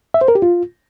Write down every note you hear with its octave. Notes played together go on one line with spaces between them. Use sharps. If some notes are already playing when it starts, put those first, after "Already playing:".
E5
C5
A#4
G4
F4